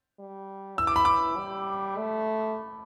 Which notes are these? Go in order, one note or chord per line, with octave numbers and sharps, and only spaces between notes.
G3
E3 E6
D6
B5
D6
G3
A3